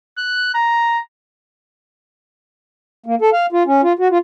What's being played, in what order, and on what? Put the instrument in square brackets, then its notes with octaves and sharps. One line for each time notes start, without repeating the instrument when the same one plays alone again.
[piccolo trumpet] F#6
A#5
[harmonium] A#3
A4
F5
F4
C#4
F4
F#4
F4